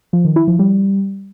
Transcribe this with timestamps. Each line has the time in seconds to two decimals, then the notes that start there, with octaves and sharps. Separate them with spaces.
0.13 F3
0.25 D#3
0.36 E4
0.48 F3
0.59 G3